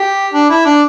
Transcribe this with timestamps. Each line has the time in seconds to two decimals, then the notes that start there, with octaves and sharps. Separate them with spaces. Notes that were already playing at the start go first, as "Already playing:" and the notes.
Already playing: G4
0.34 D4
0.50 E4
0.65 D4